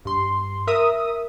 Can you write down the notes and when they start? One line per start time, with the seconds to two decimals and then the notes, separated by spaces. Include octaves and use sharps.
0.05 G2 C6
0.67 A#4 E5 D#6